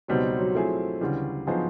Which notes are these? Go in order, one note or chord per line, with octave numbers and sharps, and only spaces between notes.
C#2 B2 F#3 G3 C4 D#4
F#3
F3 A3 C4 E4 G#4
D2 C#3 E3 G3
F3 F#3 B3 D#4 G#4 C5